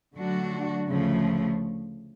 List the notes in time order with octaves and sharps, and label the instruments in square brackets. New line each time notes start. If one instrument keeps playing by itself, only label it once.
[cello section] D3 F#3 A3 D4 F#4
D2 C#3 F3 A3